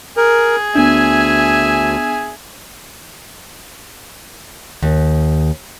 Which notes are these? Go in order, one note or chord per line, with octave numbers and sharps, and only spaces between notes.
G#4 A#4
D2 B3 D4 E5 G#5
D#2